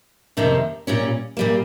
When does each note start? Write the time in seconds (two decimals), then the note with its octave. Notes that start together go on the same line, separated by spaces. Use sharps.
0.37 F2 C3 D#3 A#3 D#4
0.87 A#2 G3 C#4
1.37 A#2 G3 A#3